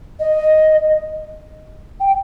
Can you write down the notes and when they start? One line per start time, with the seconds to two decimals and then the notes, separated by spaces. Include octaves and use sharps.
0.19 D#5
2.00 G5